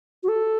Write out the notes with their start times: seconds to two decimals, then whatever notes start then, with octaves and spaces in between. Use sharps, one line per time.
0.23 F#4
0.28 A4